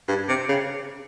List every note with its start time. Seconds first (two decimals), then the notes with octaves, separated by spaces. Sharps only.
0.08 G2
0.29 C3
0.49 C#3